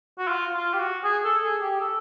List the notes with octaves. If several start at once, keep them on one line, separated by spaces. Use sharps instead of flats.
F#4
F4
F4
G4
F#4
G#4
A4
G#4
G4
A4